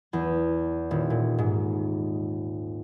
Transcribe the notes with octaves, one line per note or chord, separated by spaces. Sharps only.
E2
D#1
A#2
G#2